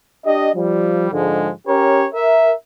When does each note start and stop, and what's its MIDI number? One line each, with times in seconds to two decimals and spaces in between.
0.24 0.50 62
0.24 0.50 67
0.24 0.50 75
0.54 1.08 53
0.54 1.08 55
1.11 1.50 44
1.11 1.50 50
1.11 1.50 53
1.11 1.50 56
1.67 2.06 61
1.67 2.06 67
1.67 2.06 70
1.67 2.06 73
2.13 2.52 70
2.13 2.52 76